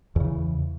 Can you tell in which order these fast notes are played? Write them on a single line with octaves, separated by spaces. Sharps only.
E2 C#3 E3